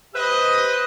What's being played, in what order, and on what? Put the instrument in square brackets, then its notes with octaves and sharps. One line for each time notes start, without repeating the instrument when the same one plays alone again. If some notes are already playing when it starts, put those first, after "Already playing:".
[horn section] G4 B4 C5 D#5